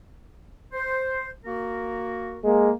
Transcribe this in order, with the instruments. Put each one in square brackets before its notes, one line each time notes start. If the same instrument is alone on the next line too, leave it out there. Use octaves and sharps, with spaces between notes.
[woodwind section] C5
A#3 F#4 A#4
[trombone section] G#3 A#3